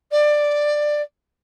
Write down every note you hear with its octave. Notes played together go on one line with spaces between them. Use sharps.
D5